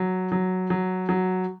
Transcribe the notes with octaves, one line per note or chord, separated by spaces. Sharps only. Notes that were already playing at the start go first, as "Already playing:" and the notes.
Already playing: F#3
F#3
F#3
F#3